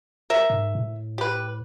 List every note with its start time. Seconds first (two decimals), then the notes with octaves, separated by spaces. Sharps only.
0.30 A#4 E5
0.50 G#2
0.75 A2
1.18 G4 B4